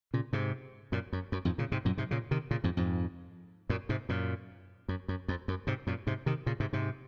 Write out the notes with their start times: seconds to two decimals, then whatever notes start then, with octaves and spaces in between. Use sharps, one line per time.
0.14 A#2 C#3
0.33 G#2 C3
0.92 F#2 A#2
1.13 F#2
1.32 F#2
1.45 F2 G#2
1.58 A#2 C#3
1.72 G#2 C3
1.85 F#2 A#2
1.97 G#2 C3
2.11 A#2 C#3
2.31 C3 D#3
2.51 A#2 C#3
2.64 F2 G#2
2.77 F2 G#2
3.69 F#2 A#2
3.89 G#2 C3
4.09 F#2 A#2
4.88 F#2
5.08 F#2
5.28 F2
5.48 F#2
5.67 G#2 C3
5.87 F#2 A#2
6.07 G#2 C3
6.26 C3 D#3
6.46 A#2 C#3
6.60 G#2 C3
6.73 G#2 C3